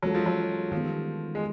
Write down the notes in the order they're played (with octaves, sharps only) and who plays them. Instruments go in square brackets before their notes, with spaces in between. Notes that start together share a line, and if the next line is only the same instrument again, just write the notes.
[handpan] E3 G#3 C#4 F4 A4 [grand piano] F#3
[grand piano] F3
F#3
[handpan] D#3 G3 B3 [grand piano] F3
[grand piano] G#3